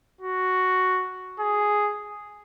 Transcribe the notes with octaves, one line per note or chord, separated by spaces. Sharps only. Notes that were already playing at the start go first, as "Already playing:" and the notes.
F#4
G#4